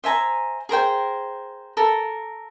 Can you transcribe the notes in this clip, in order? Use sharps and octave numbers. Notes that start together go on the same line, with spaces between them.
C5 E5 G#5 A#5
G#4 A#4 C5 G5
A4 A#4